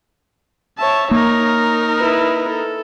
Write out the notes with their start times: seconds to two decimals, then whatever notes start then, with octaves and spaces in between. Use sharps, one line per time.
0.78 C#5 E5 A5
1.11 A#3 D#4 A#4 C#5
1.97 E4 B4
2.48 A4